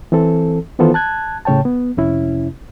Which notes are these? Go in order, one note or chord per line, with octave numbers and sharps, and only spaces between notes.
E3 C4 A4
D#3 E3 B3 F4 A4 C5
A5 F#6 G#6
A2 C#3 C#5 G5 A5
B3
F2 C3 C#4 E4